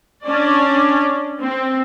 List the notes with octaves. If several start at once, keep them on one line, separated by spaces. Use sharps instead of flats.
C#4 D4 D5
C4